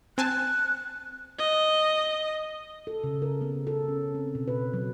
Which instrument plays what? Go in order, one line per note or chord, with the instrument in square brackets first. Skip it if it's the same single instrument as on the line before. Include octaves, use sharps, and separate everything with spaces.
[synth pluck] C4 G#5 A5 [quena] F#6
[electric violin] D#5
[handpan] A4
C#3
A#4
B3
A4
C#4
C4
B2
B4
F#3